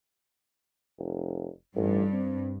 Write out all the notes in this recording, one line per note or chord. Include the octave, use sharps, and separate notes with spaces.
F1
A1 G2
C4